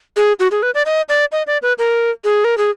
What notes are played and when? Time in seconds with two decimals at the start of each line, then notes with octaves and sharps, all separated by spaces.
0.17 G#4
0.40 F#4
0.51 G#4
0.63 B4
0.75 D5
0.86 D#5
1.09 D5
1.32 D#5
1.47 D5
1.62 B4
1.78 A#4
2.24 G#4
2.44 A#4
2.58 G#4